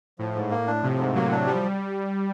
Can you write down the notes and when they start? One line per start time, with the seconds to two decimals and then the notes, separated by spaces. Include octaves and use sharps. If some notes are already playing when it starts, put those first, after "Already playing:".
0.19 A2 F3
0.35 G#2
0.51 A#3
0.67 D4
0.83 C3 F3
0.99 G#2
1.15 F#3 A#3
1.31 D4
1.46 F3 G3